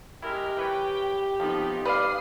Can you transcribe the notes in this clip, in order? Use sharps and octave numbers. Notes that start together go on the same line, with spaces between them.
G#3 E4 G4 A#4
E3 B4 C#5 G5
F2 F3 B3 D#4
G3 B4 D5 F5 D#6 C7